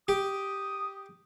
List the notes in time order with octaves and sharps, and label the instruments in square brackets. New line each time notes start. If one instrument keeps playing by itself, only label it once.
[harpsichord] G4 [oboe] D#6